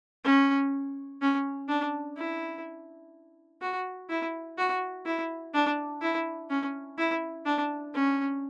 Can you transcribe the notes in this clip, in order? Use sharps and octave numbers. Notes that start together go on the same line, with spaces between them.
C#4
C#4
D4
E4
F#4
E4
F#4
E4
D4
E4
C#4
E4
D4
C#4